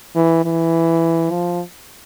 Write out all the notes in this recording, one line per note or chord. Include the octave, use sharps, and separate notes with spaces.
E3
E3
F3